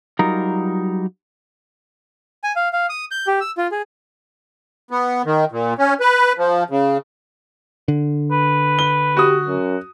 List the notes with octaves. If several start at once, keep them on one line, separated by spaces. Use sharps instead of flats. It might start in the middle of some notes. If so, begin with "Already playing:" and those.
F#3 G3 D#4 F4 A#4
G#5
F5
F5
D#6
G6
G4
E6
F4
G#4
B3
D#3
A#2
C#4
B4
F3
C#3
D3
B4
G7
F#4 G4 D#6
F#2